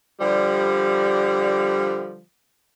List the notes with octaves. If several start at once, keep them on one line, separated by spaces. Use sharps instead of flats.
D3 F3 G3